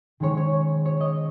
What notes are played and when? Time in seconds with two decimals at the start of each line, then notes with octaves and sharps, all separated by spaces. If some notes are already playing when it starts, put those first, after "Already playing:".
0.20 D#3 G#3 C#4 C#5
0.37 C#5
0.85 C#5
1.01 D#5